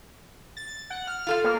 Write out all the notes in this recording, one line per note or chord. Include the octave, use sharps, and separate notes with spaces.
A6
F#5
F6
F4 A4 F5
A#3